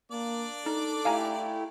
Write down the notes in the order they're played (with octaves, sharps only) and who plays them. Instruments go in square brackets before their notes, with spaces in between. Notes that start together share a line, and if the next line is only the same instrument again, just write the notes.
[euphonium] A#3 [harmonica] D4 D5 D6
[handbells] D#4 [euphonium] A4
[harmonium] A3 E4 G4 [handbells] F5 G#5 A#5